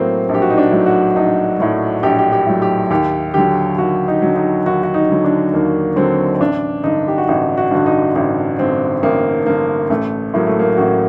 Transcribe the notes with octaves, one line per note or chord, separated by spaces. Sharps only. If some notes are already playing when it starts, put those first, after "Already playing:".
Already playing: A2 F#3 A#3 C4
A#1
G4
F#4
D#4
D4
A2 F#3
F#4
A#1 D#4
A2 F#3 F#4
A#1 G4
G4
G4
A2 F#3
G4
D#2 G4
D3 F#3 G4
D#2 F#4
D#4
D3 F#3
D#4
D#2 F#4
F#4
D#4
D3 F#3
D4
D#2 A#3
D3 F#3 C4
C4
A1 D4
G2 D3 D#4
G4
F#4
A1 D#4
F#4
G2 D3 F#4
D#4
A1 D#4
G2 D3 C4
A1 A#3
G2 D3 A#3
A1 A3
A2 F#3 A#3
A3
A#3
A1 F#4